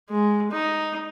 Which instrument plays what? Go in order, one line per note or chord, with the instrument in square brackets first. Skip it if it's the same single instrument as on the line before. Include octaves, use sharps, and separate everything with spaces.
[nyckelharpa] G#3
D#4